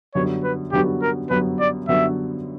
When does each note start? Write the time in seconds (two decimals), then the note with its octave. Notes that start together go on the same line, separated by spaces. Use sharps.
0.15 F#2 D3 G3 B3 F#4 C#5
0.44 B4
0.72 F#2 D3 G3 B3 F#4 G4
1.02 A#4
1.30 F#2 D3 G3 B3 F#4 B4
1.60 D5
1.88 F#2 D3 G3 B3 F#4 E5